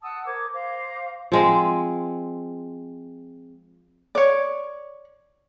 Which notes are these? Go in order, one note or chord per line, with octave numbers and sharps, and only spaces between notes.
F#5 A5 D#6 E6
A#4 C5 D6 G#6
C5 F5 A#5 D6
F3 G#3 C4
C#5 D5